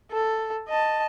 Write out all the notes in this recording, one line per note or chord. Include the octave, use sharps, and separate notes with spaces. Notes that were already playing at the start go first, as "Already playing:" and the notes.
A4
D#5 A5